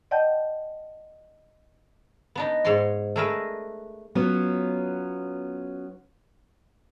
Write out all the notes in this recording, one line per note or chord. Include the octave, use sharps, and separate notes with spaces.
D5 D#5 F#5 G5 A5 G6
B3 D4 D#4
G#2 C#5 D5 C6
A3 D4 G#4 A#4 B4 E5
F#3 B3 C#4 F4